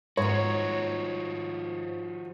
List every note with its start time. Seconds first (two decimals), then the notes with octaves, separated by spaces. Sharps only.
0.17 G#2 F3 C#4 F#4 C#5